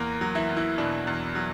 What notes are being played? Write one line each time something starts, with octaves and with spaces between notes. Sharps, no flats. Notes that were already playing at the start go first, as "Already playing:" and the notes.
Already playing: E2 A#3 A#4
F#3
E3 E4
E2
E3 E4
B2 D4
E2
F#3